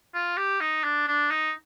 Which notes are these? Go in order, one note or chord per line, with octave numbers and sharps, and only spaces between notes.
F4
G4
D#4
D4
D4
D#4